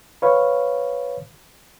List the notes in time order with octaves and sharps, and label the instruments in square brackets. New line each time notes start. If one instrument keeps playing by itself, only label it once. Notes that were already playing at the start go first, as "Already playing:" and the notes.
[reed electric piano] B4 C#5 F5